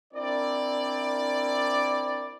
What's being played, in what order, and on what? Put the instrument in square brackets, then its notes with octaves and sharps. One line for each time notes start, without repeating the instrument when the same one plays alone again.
[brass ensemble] C4 D4 E4 A#4 D5